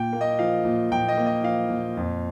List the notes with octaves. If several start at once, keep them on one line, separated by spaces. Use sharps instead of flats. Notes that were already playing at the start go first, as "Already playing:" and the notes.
Already playing: A#2 G5
A#3
D#5
F3 F5
A#2
A#2 G5
D#5
A#3
D#5
F3 F5
A#2
F2